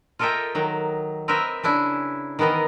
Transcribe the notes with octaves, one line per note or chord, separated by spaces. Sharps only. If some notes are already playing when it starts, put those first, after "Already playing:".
F4 A4 A#4 D#5 E5 G5
D#3 F#3
C4 A#4 B4 D#5 E5
C#3 D4 E4 G#5
D#3 E3 B3 A#4 D#5